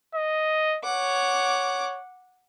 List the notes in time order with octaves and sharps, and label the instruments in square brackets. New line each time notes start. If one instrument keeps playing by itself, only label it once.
[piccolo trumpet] D#5
[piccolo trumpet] C#5 [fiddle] F#5 D6